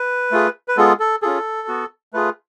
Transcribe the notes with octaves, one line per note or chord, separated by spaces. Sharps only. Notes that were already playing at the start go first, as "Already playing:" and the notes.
Already playing: B4
A3 F4 G#4
B4
G#3 B3 F4 G#4 A4
A4
C#4 F4 G#4 A4
B3 F#4
A3 F4 G#4 B4